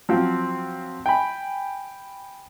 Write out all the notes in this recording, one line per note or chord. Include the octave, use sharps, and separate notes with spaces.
F3 F#3 C4 F4
G5 G#5 B5